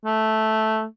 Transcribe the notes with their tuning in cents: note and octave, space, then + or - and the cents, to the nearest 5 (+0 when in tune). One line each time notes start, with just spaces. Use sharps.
A3 -5